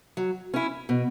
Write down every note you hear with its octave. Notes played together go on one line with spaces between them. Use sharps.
F#3
C#4 E4
B2